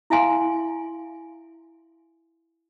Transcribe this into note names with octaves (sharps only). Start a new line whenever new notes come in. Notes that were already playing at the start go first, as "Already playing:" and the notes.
E4 E5 F5 G#5 C6